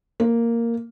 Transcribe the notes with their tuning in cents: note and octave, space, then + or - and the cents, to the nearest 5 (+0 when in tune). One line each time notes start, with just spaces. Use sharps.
A#3 -5